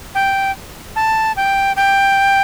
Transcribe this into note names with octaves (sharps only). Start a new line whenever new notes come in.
G5
A5
G5
G5